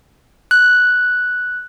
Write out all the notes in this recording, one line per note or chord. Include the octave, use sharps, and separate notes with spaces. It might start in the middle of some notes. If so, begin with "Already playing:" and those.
F#6